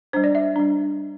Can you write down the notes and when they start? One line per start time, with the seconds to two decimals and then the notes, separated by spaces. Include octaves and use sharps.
0.13 G3 D4 C5
0.24 D5
0.35 E5
0.56 G3 D4